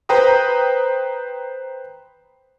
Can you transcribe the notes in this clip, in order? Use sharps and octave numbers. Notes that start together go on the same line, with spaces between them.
B4 C5 G5 A#5 D#6